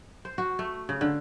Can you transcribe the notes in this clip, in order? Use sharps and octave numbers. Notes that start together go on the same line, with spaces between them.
C5
F#4
A3
C#3
D3